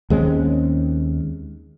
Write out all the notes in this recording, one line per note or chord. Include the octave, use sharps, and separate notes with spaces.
D#2 G#3 C4 C#4